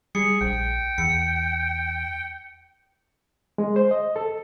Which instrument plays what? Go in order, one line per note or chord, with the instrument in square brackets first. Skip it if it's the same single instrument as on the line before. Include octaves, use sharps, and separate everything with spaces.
[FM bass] G3 [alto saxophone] G#4 [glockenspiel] C#7
[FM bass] A#1 [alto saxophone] G5
[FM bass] E2 [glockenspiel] C#7
[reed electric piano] G#3
C5
D#5
A4